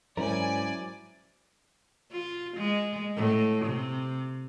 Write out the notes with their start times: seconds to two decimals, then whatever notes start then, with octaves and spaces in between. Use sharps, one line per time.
0.17 G#2 F#3 C#4 E4 A#4 C5 D5 G#5
2.11 F4
2.57 G#3
3.17 A2
3.65 C3